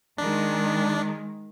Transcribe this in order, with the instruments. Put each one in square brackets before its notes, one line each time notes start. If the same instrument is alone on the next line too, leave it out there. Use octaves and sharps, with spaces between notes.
[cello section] D#3 G#3 [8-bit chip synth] D4